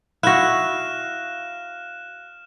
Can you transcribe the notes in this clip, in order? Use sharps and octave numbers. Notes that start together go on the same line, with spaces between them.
E4 F#4 F5 F6 F#6 A#6 E7